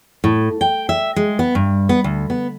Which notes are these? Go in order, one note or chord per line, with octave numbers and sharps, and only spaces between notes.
A2
G5
E5
G#3
B3
G2
B3
D2
B3